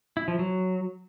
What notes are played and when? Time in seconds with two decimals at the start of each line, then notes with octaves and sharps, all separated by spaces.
0.17 E4
0.28 F3
0.39 F#3